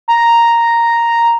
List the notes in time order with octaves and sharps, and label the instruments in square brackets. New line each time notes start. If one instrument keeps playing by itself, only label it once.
[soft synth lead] A#5